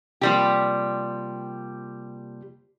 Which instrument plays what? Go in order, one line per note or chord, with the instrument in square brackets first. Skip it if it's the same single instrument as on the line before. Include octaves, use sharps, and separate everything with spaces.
[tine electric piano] C3 A#3 [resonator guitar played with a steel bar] F3 G3 G4